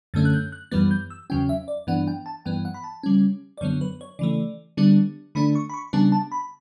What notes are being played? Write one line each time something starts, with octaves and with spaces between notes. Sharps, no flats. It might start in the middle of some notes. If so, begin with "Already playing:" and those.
F#2 D3 A3 C#4 A6
F#6
G6
F#6
F#2 E3 G3 B3 A6
G6
E6
E2 C#3 F#3 C#4 G5
E5
D5
G2 E3 B3 D4 F#5
G5
A5
G2 E3 B3 G5
F#5
B5
A5
C#3 G3 C#4
D5
F#2 D3 F#3 B3 C#5
B4
C#5
C#3 E3 A3 D5
D3 G3 B3 D4
D3 A3 D4 B5
C#6
B5
C#6
C#3 G3 B3 D4 A5
A5
B5